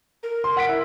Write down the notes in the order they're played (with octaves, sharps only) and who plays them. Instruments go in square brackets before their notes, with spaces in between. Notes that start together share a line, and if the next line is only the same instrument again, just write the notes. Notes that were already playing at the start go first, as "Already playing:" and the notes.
[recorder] A#4
[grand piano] C6
F#5 B6 D7
E4